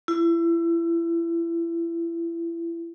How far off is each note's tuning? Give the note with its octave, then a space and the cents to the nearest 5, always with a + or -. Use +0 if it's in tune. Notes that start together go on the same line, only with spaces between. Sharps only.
E4 +30